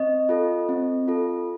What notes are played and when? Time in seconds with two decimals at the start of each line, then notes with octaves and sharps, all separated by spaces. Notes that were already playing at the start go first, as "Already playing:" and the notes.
Already playing: C4 D#5
0.29 F4 A4
0.69 C4
1.08 F4 A4